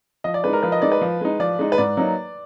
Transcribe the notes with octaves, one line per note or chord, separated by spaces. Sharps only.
F3 D#5
D5
G#3 D#4 B4
A#4
F3 B4
D#5
G#3 D#4 D5
B4
F3
G#3 D#4
F3 D5
G#3 D#4
B4
G#2 D5
F#3 A#3 D#4